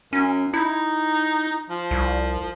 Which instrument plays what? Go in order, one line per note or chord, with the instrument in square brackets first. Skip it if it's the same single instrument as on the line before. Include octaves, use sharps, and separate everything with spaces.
[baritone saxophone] F#2 [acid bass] C#4
[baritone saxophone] D#4 [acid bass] E4
[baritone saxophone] F3
[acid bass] C2